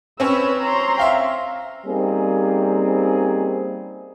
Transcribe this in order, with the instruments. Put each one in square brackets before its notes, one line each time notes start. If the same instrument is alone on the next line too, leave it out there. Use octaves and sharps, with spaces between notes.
[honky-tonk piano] C4 C#4 C#5 [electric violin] B4 E6
[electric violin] A#5 C6
[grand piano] E5 F5 G5
[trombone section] G3 A#3 C4 C#4 D#4 G#4